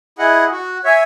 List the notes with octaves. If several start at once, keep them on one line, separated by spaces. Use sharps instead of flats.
E4 G#4 D#5 F#5
F#4
C#5 E5 G#5